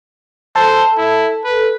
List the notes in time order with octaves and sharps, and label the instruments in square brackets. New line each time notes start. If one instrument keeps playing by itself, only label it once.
[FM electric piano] A4 [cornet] C5
[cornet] E4
B4